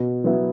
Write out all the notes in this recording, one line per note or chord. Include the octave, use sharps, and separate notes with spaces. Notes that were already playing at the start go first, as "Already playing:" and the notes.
Already playing: B2
F#3 B3 E4